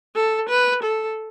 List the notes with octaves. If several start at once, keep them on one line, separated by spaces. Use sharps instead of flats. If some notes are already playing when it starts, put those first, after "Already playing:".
A4
B4
A4